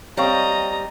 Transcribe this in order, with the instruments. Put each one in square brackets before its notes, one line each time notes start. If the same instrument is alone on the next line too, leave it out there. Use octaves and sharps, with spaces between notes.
[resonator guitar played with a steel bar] G3 C4 [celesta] C#5 F5 C#6 [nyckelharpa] D#5 A#5